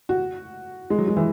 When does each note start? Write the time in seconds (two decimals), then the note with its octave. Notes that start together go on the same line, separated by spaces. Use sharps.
0.09 F#4
0.90 G#3
0.98 F#3
1.08 G#3
1.17 E3